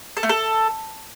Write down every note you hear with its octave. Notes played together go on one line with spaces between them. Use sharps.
A4
A3
A4